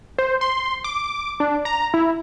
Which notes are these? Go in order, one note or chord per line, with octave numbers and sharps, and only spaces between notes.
C5
C6
D6
D4
A#5
E4